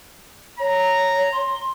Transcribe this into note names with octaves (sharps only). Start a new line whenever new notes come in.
C#5 A#5
C6